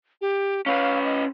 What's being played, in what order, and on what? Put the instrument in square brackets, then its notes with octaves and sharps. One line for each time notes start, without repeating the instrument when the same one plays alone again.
[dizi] G4
[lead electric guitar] C#4 B4 [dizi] F5
[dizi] D#5